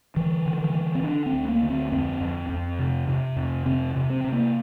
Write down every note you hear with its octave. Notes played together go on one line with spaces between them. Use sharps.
D3 E3
D3
E3
D3
C4
D3 D4
C4
D2
A#3
D3
C4
F2 C4
F2
F2
C3
C3
F2
C3 C4
C3
C4
C3
A#3